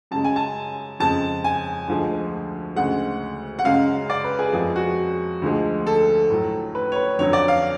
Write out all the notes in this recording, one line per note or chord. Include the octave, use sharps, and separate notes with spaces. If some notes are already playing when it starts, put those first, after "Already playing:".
F#2 C#3 G#3 A5
G#5
A5
F2 C#3 G#3 A5
G#5
D2 D3 F3 G#3
D2 C#3 G#3 F#5
F#5
F#2 C#3 G#3 F5
D5
B4
G#4
F2 F3 G#3 G#4
F#4
D2 D3 F3 G#3
A4
A2 F#3
B4
C#5
B4
F2 D3 F#3 C#5
D5
F5